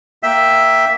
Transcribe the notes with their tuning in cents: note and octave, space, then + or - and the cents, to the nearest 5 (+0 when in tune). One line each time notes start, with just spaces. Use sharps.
A#3 +0 E5 +0 G5 +0